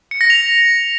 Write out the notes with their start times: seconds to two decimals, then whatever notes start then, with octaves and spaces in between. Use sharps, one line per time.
0.11 C#7
0.21 A#6
0.30 F7